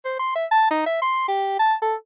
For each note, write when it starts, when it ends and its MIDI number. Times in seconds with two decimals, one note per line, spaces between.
0.05 0.14 72
0.19 0.32 84
0.35 0.46 76
0.51 0.70 81
0.71 0.86 63
0.86 0.98 76
1.02 1.27 84
1.28 1.57 67
1.59 1.75 81
1.82 1.95 69